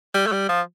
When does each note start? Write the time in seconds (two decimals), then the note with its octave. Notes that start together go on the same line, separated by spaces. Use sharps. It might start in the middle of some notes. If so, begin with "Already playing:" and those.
0.14 G3
0.27 A3
0.32 G3
0.49 F3